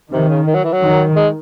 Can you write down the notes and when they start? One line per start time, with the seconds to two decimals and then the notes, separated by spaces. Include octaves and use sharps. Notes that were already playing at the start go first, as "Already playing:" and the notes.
0.11 C3 D#3
0.28 C#3
0.46 D#3
0.55 F#3
0.64 E3
0.72 F#3
0.81 D#3
1.16 G#3